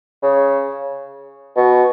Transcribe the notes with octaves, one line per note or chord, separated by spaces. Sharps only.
C#3
B2